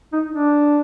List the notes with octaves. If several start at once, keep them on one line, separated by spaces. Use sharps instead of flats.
D#4
D4